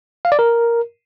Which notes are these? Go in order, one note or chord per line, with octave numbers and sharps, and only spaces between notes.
F5
D5
A#4